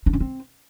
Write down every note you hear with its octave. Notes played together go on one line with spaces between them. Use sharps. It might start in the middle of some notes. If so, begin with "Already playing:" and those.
D4
C#4
C4